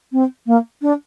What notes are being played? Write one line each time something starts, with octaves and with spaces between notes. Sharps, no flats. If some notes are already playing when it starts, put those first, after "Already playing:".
C4
A#3
D4